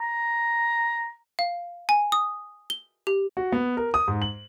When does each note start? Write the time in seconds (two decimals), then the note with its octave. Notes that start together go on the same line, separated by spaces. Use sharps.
0.01 A#5
1.39 F5
1.89 G#5
2.12 D#6
2.70 G7
3.07 G4
3.37 F#4
3.52 B3
3.77 A#4
3.94 D#6
4.08 G#2
4.22 F#7